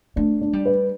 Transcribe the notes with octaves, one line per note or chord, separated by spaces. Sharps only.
A3 D4
D4
G3
B4